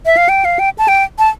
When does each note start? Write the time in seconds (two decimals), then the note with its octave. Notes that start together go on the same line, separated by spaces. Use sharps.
0.06 E5
0.17 F5
0.29 G5
0.45 F5
0.59 G5
0.78 A5
0.88 G5
1.19 A5